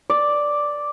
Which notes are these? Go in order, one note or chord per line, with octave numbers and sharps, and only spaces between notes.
D5